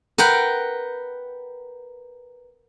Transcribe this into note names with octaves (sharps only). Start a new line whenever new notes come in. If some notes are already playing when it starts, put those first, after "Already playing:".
A#4 B4 F#5 G5